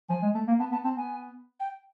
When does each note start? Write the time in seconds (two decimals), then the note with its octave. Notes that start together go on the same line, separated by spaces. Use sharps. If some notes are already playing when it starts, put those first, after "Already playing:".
0.09 F3 G#5
0.22 G#3
0.35 A3
0.48 A#3
0.60 B3 A5
0.72 B3 A5
0.84 C4 A5
0.97 B3 G#5
1.60 G5